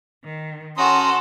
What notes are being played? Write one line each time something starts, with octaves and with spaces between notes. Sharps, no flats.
D#3
C#4 F#4 A4 A#5 C6 D#6